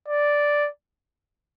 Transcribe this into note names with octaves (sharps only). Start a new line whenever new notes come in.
D5